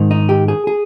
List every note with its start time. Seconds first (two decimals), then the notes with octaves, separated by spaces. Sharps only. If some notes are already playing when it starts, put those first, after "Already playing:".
Already playing: G#2 D#3
0.11 D#4
0.29 G4
0.48 G#4
0.67 G#4